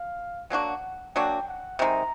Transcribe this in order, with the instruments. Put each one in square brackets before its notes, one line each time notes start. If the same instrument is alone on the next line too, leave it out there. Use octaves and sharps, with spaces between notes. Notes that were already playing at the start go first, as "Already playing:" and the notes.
Already playing: [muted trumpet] F5
[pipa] F#3 A#3 D4 F#4 [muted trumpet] F#5
[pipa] F#3 A#3 D4 F#4 [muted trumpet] G5
[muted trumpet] F#5
[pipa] C3 D#3 G#3 [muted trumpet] A#5